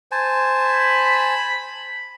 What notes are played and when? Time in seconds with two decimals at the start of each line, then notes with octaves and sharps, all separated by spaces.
0.11 C5 G#5 A5
0.62 B5